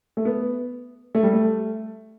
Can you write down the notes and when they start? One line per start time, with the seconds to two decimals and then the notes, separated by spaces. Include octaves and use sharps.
0.17 A3
0.25 B3
1.15 A3
1.23 G3
1.33 A3